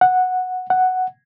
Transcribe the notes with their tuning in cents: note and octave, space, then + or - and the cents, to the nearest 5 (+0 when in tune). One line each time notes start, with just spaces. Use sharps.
F#5 -5
F#5 +5